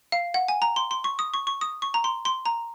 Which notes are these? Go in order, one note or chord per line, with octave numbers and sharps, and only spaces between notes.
F5
F#5
G#5
A#5
C6
C6
C#6
D#6
C#6
C#6
D#6
C#6
A#5
C6
C6
A#5